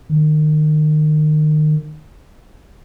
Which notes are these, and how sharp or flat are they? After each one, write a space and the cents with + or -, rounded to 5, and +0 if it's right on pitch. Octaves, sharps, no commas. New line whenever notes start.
D#3 -30